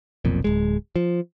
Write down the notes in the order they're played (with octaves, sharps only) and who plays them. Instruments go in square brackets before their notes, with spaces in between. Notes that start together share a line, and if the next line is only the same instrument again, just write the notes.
[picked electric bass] F1 B1 F2 A#2
D1 G#3
F3